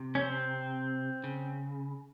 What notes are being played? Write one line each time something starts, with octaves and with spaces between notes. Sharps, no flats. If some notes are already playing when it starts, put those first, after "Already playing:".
Already playing: C3
C#4
C4
C#3